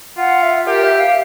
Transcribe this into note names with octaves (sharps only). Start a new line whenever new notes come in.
F4 F#5
E5
G4 A#4
E5
F5